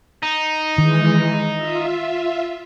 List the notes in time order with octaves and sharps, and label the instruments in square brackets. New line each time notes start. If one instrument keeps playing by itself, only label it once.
[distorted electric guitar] D#4
[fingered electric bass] D#3 [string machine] E3 G#3
[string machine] F4 E5